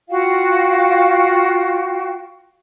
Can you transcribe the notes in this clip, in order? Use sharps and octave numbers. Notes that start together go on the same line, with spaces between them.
F4 F#4 F5 G5